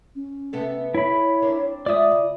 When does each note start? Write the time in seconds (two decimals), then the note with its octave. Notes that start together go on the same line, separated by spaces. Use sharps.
0.15 C#4
0.53 C3 B3 A4
0.95 E4 C#5 B5
1.42 C4 D4 A#4
1.86 G#3 F4 D5 E5 D#6
2.12 C#3